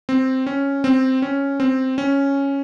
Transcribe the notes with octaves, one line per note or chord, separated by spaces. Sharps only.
C4
C#4
C4
C#4
C4
C#4